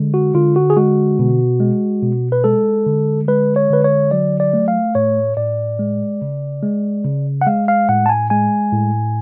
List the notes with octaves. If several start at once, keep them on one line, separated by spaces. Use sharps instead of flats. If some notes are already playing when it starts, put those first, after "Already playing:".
Already playing: D3 G#3
F#4
D3 F4
F#4
G#4
G#3 F#4
B2
G#3
B2
B4
G#3 A4
D3
G#3 B4
C#5
D3 B4
C#5
F#3 D5
D5
A3
F5
A2 C#5
A2 D5
G#3
C#3
G#3
C#3
F#5
G#3 F5
F5
A2 F#5
A5
G#5
G#3 G#5
A2